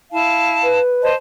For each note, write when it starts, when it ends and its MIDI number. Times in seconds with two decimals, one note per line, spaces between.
0.12 0.79 64
0.12 0.79 77
0.12 0.79 81
0.64 1.11 71
1.03 1.14 72
1.03 1.14 75
1.03 1.14 81